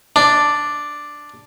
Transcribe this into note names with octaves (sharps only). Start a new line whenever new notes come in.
D4